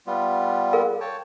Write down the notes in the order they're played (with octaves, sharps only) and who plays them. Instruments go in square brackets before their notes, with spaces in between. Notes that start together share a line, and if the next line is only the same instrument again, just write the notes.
[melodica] G3 B3 F4
[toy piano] G#4 A#4 F5
[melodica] C#5 G5 A5